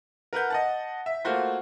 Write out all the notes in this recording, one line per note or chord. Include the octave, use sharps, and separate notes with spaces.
A#4 B4 F#5 G6
D#5 F#5 A5
E5
A3 A#3 F4 F#4 C5